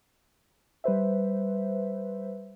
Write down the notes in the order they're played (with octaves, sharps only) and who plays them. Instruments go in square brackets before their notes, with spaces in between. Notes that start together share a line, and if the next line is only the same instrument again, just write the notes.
[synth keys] G3 B4 C5 E5